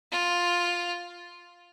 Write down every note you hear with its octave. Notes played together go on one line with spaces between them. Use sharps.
F4